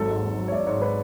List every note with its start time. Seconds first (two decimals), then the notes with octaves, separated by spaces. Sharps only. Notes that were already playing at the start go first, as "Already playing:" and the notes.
Already playing: G#1 F#3 A4
0.08 G#2
0.23 G#1
0.38 F#3
0.48 C#5
0.52 G#1 D5
0.67 G#2 C#5
0.82 B4